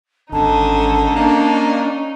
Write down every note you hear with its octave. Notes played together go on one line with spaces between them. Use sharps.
G#1 D3 C#4 D#4 A5
A#3 D4